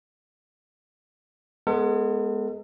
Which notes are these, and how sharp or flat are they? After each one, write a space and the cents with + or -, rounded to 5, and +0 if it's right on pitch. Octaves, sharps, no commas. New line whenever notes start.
G#3 +15 B3 +0 A4 +45